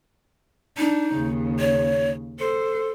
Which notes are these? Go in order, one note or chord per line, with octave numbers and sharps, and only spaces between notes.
D4 D#4
D#2 C#3
C#5
A4 C5